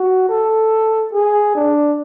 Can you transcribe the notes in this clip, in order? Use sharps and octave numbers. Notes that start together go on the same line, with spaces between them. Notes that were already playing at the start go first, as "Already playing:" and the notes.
Already playing: F#4
A4
G#4
D4